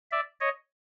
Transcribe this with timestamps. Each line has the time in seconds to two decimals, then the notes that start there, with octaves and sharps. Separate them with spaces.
0.11 D5 E5
0.40 C#5 D#5